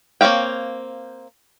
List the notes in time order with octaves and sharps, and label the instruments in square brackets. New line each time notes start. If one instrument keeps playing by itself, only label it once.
[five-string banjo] A#3 C4 C#5 F5 G5